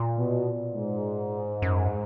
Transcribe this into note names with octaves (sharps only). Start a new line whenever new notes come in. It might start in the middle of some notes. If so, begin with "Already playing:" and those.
Already playing: A#2
B2
G#2
F#2